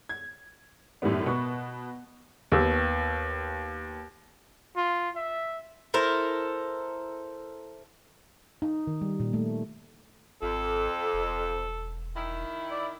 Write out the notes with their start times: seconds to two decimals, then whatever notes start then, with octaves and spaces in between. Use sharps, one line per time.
0.09 G#6
1.02 F#2 A2 D#3 G3 B3
1.26 B2 B4 C#6
2.52 D#2 B3 E6
4.76 F4
5.16 E5
5.94 E4 A4 A#4 C5
8.62 D#4
8.87 D#3
9.01 G3
9.20 A#2
9.33 A3
10.42 G#1 F2 A4
11.13 E1
12.16 D#3 E4
12.71 D5